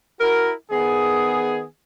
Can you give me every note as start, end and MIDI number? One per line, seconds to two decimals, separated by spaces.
0.21 0.52 64
0.21 0.52 66
0.21 0.52 70
0.71 1.64 51
0.71 1.64 59
0.71 1.64 68